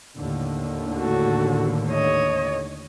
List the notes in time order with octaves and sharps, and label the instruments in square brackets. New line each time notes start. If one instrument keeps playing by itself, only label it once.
[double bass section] D#2 A2 D3
[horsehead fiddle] F#4 A4
C#5 D#5